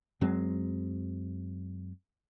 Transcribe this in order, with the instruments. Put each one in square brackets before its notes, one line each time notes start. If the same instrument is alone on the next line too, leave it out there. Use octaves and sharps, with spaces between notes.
[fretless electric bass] F#2 F#3 G#3 C4